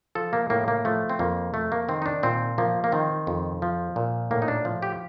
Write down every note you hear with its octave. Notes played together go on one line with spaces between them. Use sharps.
F3 A4
A#3
A2 A#3
A#3
F3 A3
C4
F2 A#3
F2 A3
A#3
D#3 C4
D#4
D4
A#2 C4
F3 A#3
A#3
D#3 C4
F2
F3
A#2
A2 A#3
D#4
D4
F3
G4